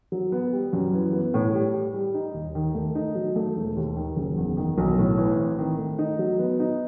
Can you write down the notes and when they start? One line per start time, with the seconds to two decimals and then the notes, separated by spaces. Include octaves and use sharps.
0.12 F#3
0.32 B3
0.53 G3
0.73 F#2
0.94 E3
1.13 B3
1.34 A2
1.54 G3
1.74 G4
1.94 G3
2.14 D#4
2.34 D#2
2.55 D#3
2.75 A3
2.95 D#4
3.15 F#3
3.36 A3
3.56 E1
3.77 D#2
3.96 D#3
4.17 F#1
4.37 E2
4.57 D#3
4.78 B1
4.98 A2
5.18 E3
5.38 C4
5.59 D#3
5.79 A3
5.98 D#4
6.19 F#3
6.39 B3
6.59 D#4